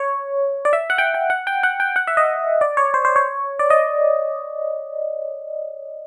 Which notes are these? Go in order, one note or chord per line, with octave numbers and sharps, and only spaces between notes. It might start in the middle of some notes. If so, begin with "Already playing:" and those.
Already playing: C#5
D5
E5
F#5
G5
G5
F#5
G5
F#5
G5
F#5
E5
D#5
D5
C#5
C5
C5
C#5
D5
D#5